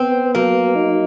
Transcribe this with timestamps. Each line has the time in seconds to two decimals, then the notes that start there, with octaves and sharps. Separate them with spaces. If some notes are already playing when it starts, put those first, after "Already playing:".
Already playing: B3 C4
0.35 F#3 A#3
0.76 D#4